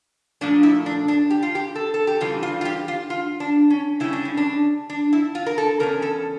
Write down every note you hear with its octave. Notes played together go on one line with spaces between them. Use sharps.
A#2 F3 A3 D4
E4
D4
D4
G4
F4
G4
A4
A4
G4
C#3 E3 G3 F4
F4
F4
G4
F4
F4
D4
C#4
C#3 G3 C#4 E4
D4
C#4
D4
D4
E4
F4
A#4
A4
E2 C#3 C#4 A#4
A4